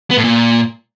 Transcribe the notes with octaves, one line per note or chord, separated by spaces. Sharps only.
B3
A2
A#2